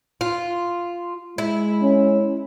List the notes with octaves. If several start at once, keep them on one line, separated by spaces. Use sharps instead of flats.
F4
G#3 E4
C#4